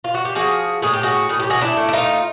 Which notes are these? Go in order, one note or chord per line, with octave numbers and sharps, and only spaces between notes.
F4
F#4
G4
F3 F#4 G#4
A2 G#4
G4
F#4 G#4
A2 G#4
G4
F#4 G#4
D4 E4
A3
E4
D#4 F4